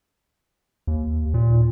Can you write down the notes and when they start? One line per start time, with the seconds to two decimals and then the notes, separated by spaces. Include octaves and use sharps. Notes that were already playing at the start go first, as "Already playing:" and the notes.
0.87 D#2
1.34 A#2